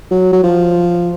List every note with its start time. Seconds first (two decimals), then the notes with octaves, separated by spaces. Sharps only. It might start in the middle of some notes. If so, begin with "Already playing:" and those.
0.11 F#3
0.33 F#3
0.44 F3